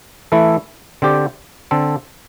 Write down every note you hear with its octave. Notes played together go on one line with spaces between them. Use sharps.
E3 A3 E4 A4
D3 C4 G4 D5
D3 C4 A4